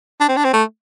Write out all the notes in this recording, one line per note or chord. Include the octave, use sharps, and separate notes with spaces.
D4
C4
D4
C4
A3